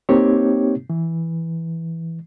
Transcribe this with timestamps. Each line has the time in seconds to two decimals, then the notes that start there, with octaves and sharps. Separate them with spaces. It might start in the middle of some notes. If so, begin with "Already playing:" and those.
0.09 A#3 C4 D#4 G4 C#5
0.90 E3